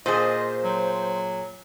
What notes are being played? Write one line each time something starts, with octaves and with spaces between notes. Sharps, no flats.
A#2 G#4 C5 D#5
F#3